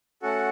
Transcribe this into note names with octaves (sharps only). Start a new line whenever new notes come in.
A3 C#4 F#4 A4 F#5